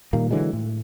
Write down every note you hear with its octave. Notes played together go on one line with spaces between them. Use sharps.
A#2 D#3 G3 A#3
D3 E3 F#3 G#3
A2